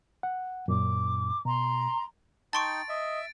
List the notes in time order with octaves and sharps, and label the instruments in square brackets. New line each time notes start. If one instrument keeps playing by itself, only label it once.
[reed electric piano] F#5
[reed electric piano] F#2 A#2 [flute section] D6
[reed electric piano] B2 [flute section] A#5 C6
[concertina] D#4 G5 [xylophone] A5 C6 C#6 [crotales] A6 D7
[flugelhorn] D#5 [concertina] E5